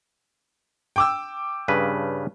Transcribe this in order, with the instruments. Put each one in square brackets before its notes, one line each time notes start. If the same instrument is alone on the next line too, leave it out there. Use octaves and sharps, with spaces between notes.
[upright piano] G5 D6 E6
[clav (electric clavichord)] G2 C#3 B4